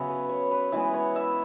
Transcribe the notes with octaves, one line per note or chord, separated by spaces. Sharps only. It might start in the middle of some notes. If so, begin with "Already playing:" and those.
Already playing: C#3 F#3 B3 C#5 E5
B4
C#5
B4
E3 G#3 B3 E5
C#5
E5